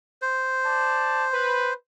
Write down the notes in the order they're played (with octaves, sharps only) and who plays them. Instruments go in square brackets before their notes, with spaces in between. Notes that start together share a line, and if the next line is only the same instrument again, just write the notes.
[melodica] C5
[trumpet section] D5 A5
B4